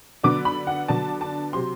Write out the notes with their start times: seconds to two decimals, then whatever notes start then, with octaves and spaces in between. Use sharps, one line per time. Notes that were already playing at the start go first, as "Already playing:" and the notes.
0.23 D3 F#3 B3 D4 D6
0.45 B5
0.67 F#5
0.88 D3 F#3 B3 D4 A5
1.21 A5
1.53 C3 F#3 C4 C6